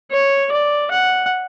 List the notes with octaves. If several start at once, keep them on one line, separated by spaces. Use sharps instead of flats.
C#5
D5
F#5